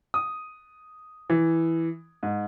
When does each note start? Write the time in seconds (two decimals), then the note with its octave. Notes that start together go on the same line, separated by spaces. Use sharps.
0.14 D#6
1.30 E3
2.23 G#2